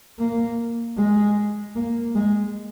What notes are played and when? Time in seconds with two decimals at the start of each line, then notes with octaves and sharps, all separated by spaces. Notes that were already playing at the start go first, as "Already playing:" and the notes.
0.19 A#3
0.98 G#3
1.76 A#3
2.15 G#3